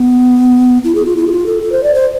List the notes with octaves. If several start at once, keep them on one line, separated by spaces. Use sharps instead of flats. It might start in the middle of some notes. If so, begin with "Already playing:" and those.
Already playing: B3
E4
G#4
F4
E4
G#4
F4
A4
A4
C5
D5
C5